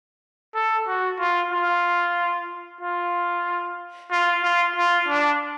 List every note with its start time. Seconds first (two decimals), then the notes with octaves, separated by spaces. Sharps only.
0.55 A4
0.87 F#4
1.19 F4
1.52 F4
2.81 F4
4.11 F4
4.43 F4
4.76 F4
5.08 D4